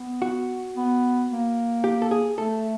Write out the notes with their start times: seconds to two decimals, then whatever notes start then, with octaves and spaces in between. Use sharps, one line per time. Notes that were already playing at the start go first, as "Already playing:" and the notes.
Already playing: B3
0.22 F#4
0.76 B3
1.29 A#3
1.84 G4
2.02 A4
2.11 G#4
2.38 A3 A4